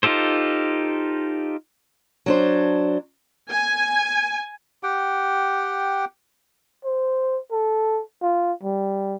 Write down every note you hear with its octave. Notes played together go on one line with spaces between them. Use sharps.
D#4 F4 G4 A4 C5
F#3 D4 C5
G#5
G4 F#5 G5
C5
A4
F4
G3